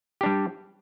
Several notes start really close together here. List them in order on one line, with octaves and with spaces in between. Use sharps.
G4 D4 G3